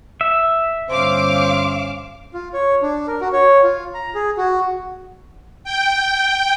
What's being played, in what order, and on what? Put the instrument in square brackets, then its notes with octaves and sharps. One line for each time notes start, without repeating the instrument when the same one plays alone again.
[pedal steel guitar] E5
[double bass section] G1 C#4 [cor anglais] C5 [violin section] F5 D6
[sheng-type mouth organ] F4
C#5
D4
A#4
F#4
C#5
F4
A#5
G#4
F#4
[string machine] G5